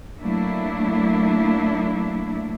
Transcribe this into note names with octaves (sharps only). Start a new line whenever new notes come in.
F#3 A3 A#3 D4 E4